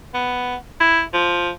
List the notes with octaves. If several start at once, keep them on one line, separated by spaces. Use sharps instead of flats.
B3
E4
F3